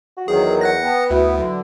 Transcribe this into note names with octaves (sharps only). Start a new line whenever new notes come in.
F#4
E2 D#3 F#3 G#4
F#5 F#6 A#6
B3 G5 A5
D2 E4 F#4 B4
D3 F#3